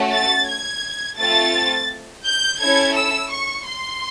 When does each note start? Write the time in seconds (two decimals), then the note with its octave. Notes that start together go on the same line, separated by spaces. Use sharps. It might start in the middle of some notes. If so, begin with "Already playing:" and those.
Already playing: A3 C#4 F#4
0.13 A6
0.48 G#6
1.18 A3 C4 F4 A4 A6
2.25 G6
2.60 C#4 E4 A4 G#6
2.96 E6
3.31 C#6
3.66 C6